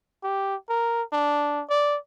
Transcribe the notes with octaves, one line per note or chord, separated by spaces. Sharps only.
G4
A#4
D4
D5